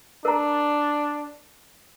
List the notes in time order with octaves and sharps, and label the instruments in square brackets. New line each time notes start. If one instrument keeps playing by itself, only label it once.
[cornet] D4 [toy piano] A#4 A#5